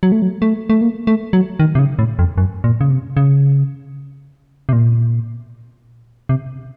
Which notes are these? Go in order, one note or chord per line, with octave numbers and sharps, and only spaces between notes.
F#3
A3
F#3
A3
A3
A#3
A3
F#3
D#3
C3
C#3
A2
F2
F#2
A#2
C#3
C3
C#3
C3
A#2
C3